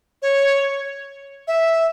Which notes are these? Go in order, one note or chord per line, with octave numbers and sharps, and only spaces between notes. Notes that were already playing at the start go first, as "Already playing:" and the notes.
C#5
E5